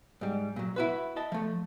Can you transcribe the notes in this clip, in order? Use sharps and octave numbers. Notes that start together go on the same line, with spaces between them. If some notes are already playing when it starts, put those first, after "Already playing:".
G#2 G3
A#2 F#3
E4 F#4 B4
D#5 E5 A5
F3 A3